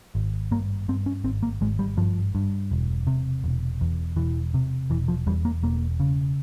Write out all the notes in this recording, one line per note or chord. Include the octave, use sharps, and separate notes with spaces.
G#1
G2 A#3
G2 C4
C#4
G#1 C4
A#3
G#1 G#3
G3
G2 F3
G2
E1
C3
E1
E2
E1 E3
C3
E1 E3
F3
E2 G3
A#3
E1 A#3
C#3